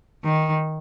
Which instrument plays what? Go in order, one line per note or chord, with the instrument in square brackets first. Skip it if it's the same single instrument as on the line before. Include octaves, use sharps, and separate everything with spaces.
[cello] D#3